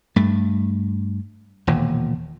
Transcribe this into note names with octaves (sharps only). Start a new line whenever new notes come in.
G2 A3
E1 D#2 A#2